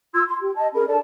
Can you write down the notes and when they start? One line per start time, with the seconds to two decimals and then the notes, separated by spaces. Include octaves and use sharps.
0.14 F4 C6 E6 G#6
0.27 C6
0.41 G4
0.55 D#5 A5
0.74 C#4 G#4 A#4 B5
0.88 D4 A4 D5 A5